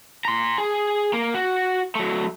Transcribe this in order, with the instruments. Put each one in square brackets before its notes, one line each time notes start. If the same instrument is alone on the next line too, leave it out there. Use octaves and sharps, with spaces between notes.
[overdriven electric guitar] A#5 C6
G#4
A#3
F#4
F#3 A3